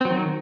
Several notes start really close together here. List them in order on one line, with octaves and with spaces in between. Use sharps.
C4 F#3 D#3